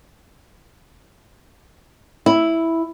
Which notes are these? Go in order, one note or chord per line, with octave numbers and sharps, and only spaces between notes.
E4